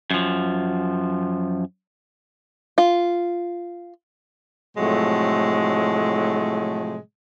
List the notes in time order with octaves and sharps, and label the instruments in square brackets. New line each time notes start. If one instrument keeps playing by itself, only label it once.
[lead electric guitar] F#2 F3
[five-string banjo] F4
[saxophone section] A2 C3 F3 F#3 G#3 A3